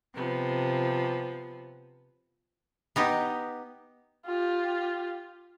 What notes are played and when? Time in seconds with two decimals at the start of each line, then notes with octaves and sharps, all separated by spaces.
0.15 C3 F3 B3
2.96 B3 D#4 G4
4.25 F4 G4